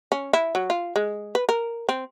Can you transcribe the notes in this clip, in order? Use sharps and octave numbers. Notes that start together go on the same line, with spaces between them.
C#4
E4
F#3
F4
G#3
B4
A#4
C4